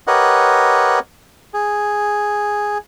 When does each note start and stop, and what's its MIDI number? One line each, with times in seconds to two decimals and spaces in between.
0.07 0.99 67
0.07 0.99 70
0.07 0.99 71
0.07 0.99 73
0.07 0.99 75
0.07 0.99 78
1.54 2.78 68